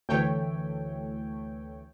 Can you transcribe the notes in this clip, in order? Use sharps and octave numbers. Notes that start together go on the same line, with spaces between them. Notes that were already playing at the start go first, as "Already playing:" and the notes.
D2 E3 A3 C#5 G5